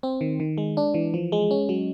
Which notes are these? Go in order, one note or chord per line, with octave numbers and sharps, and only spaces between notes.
C4
D#3
D#3
G#3
D4
E3
F3
G#3
C#4
F#3